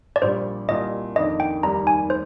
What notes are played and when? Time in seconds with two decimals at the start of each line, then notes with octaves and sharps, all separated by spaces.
0.16 D5
0.22 A#1 A#2 G3 C5
0.69 C2 A#2 G3 D#5
1.16 F2 D#3 A#3 D4 D#5
1.40 G5
1.63 F1 D#2 D#3 G3 A#3 A#5
1.87 G#5
2.10 C5